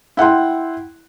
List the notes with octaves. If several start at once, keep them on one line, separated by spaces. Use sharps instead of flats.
E4 F#5 G5 C6